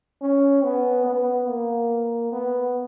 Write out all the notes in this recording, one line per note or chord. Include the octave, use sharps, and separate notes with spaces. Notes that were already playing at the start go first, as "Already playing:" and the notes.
C#4
B3
B3
A#3
B3